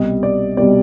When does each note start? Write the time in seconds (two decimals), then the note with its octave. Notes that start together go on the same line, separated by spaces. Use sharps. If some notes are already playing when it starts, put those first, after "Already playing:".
Already playing: C2 B2 G3 D#5
0.23 D5
0.57 C2 B2 G3 D5